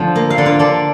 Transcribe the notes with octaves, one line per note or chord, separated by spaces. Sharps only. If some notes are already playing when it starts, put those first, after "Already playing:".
Already playing: D3 F3 C5
A#3
F5
D3 D5
F4 F5
D3 D4 D5